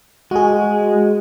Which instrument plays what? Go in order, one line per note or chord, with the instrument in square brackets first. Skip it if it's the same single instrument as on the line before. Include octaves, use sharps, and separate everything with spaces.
[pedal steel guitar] G#3 [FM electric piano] F#4 G#4